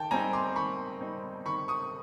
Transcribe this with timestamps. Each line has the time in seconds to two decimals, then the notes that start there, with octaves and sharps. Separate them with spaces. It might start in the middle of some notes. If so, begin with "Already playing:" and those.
Already playing: D#3 G5 A5
0.11 G3 C4 D#4 G#5 A#5
0.33 C6 D6
0.56 D#3 B5 C#6
1.01 G3 C4 D#4
1.46 D#3 B5 C#6
1.68 C#6 D#6